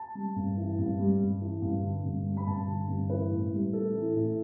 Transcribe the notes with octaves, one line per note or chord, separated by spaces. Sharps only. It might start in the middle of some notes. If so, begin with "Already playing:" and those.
Already playing: A5
G3
G2
E3
G2
G3
G2
E3
G2
D3
G2
G3
B5
G2 A5
D3
G2
E3 B4
A2
G3
A2 A4
E3
A2